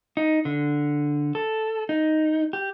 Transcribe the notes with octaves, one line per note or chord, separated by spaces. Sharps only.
D#4
D3
A4
D#4
G4